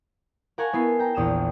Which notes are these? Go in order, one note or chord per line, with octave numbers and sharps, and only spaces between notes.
A#4 F5 F#5 G#5 A5 C#6
B3 E4 B4 C7
G5 A#5
A#1 E2 D#6 F6 E7